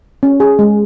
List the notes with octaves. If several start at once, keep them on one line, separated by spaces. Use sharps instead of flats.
C#4
G#4
G#3